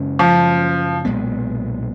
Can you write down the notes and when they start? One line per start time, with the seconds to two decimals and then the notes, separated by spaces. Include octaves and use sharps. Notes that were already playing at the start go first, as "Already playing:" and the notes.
Already playing: F#2 C#3 G#3 C#4
0.19 F3
1.05 B1 A#2 G#3 B3